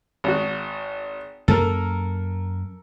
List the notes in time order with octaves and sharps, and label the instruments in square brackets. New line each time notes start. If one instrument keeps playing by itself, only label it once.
[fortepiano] G#1 F#4
[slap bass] F#2 A#3 [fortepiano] A4 A#4